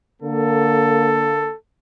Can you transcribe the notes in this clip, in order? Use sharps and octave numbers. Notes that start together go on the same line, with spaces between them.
D3 A#3 A4